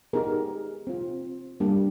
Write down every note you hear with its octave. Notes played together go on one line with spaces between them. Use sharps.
B3 D#4 G4 G#4 A#4
C4 F4
G3 A#3 D4 G4